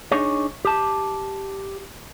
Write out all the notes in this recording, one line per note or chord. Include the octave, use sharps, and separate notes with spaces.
D4 D#4 G#4 C#5
G4 A5